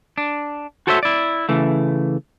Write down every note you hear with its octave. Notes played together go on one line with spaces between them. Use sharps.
D4
F#4 A4 C5 C#5 D#5 E5
E4 D5
C#3 E3 A3